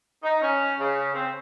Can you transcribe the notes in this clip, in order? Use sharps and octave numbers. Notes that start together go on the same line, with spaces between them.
D#4
C#4
C#3
C4